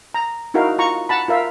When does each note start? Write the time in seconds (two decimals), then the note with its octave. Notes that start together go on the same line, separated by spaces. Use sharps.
0.14 A#5
0.54 D#4 E4 F#4 A#4 F5
0.79 F4 A#5 C#6
1.09 F#5 A5 B5
1.28 F4 A#4 E5 F5